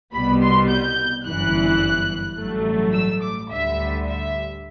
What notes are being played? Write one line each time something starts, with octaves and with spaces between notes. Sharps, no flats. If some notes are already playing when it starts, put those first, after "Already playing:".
C2 B2 G3 B3 B5
C6
G6
G1 F#2 E3 F#6
A1 G2 F#3 A3
E6
D6
D2 D3 G3 E5
E5